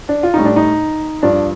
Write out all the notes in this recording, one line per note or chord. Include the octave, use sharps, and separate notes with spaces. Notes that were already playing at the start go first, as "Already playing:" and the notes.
D4
F4
A2 G3 D#4
D4
D#4
G2 F3 D4